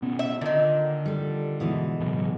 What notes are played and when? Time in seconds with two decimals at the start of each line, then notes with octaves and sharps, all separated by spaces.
0.02 B2 B3 C#4
0.19 E5
0.41 A#2 D3 D#3
1.06 G3 A4
1.60 B2 E3 G#3
2.00 A2 C#3 F#3